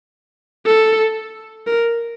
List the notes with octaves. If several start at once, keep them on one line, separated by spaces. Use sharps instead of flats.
A4
A#4